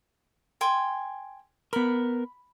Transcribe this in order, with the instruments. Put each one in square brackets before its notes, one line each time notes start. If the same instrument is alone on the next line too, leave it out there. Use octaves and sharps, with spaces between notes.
[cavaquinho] G5 G#5 C6
[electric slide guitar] B3 A#4 [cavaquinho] B5